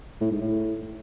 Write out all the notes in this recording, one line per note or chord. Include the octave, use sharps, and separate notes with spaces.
A2
G#2
A2